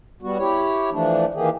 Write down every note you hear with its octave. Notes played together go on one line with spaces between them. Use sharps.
G3 B3 F#4
E4 G4 C#5
E3 F3 A3 D4
D#3 E3 A#3 G4 G#4